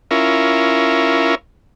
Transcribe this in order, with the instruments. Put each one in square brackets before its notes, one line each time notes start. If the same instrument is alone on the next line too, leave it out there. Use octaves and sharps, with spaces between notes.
[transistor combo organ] C#4 E4 F4 A#4